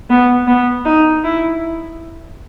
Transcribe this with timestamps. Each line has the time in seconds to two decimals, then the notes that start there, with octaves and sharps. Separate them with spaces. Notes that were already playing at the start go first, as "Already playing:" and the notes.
0.10 B3
0.47 B3
0.85 D#4
1.24 E4